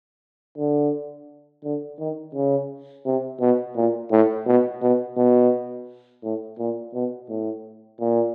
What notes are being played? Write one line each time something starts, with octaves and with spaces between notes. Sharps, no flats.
D3
D3
D#3
C#3
C3
B2
A#2
A2
B2
B2
B2
A2
A#2
B2
A2
A#2